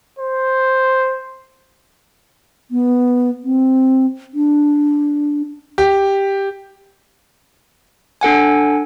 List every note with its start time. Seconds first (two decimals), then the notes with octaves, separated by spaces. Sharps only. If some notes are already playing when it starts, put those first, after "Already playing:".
0.19 C5
2.71 B3
3.44 C4
4.34 D4
5.78 G4
8.21 D4 A4 F#5 G#5